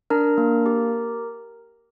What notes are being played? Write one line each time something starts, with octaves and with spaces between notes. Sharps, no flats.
D4 A#4 A#5
A#3
G4